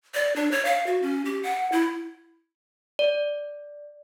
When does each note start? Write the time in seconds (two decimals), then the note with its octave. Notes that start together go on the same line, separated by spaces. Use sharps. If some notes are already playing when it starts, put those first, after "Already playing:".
0.14 D5
0.36 D4
0.51 C#5
0.65 F5
0.86 F#4
1.02 C#4
1.25 G4
1.43 F#5
1.72 E4
2.99 D5